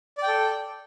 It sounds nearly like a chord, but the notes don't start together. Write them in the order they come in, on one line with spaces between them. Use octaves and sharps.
D5 G5 A4